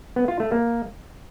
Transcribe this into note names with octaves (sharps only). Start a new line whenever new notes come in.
B3
F4
A3
A#3